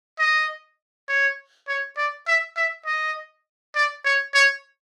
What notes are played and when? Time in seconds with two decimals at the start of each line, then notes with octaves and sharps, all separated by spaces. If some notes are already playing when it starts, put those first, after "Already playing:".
0.19 D#5
1.09 C#5
1.68 C#5
1.97 D5
2.28 E5
2.57 E5
2.86 D#5
3.75 D5
4.05 C#5
4.34 C#5